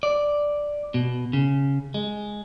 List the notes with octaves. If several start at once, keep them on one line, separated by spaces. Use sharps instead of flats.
D5
B2
C#3
G#3